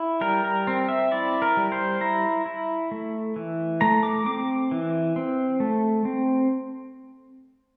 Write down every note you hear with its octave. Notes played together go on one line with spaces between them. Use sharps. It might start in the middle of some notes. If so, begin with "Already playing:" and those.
Already playing: E4
G3 A#4
A#4
C4
E5
E4 D5
A#4
G3
C5
E4 A#5
E4
A3
E3
A3 A#5
D6
C4 D6
E3
C4
A3
C4